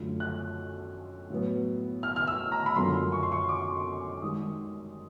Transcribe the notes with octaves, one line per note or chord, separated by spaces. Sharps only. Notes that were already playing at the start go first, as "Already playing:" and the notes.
Already playing: F#2 D3 F3 A3
F#6
A2 F#3 B3
F6
F6
E6
A#5
B5
F#2 D3 F3 A#3 C6
C#6
C6
C#6
D6
G#2 D#3 G3 D#6